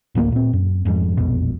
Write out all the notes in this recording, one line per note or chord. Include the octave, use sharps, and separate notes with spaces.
A1 D2 G3 A#3
A#2 C4
F#2
F1 F2 G#2
E1 A#1 F2 B2